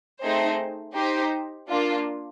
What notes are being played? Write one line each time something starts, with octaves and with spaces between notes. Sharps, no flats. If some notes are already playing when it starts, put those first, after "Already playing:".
A3 C4 D#4 G#4 C5
D#4 G4 C5
A#3 D4 F4